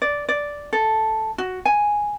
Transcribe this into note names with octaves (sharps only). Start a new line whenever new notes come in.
D5
D5
A4
F#4
G#5